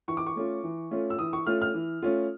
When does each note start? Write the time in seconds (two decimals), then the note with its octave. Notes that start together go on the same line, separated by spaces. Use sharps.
0.08 E3 C#6
0.17 D6
0.26 C#6
0.36 A3 C#4 F4
0.64 E3
0.91 A3 C#4 F4
1.10 E6
1.19 E3 D#6
1.33 C#6
1.46 A3 C#4 F4 F6
1.62 F6
1.74 E3
2.02 A3 C#4 F4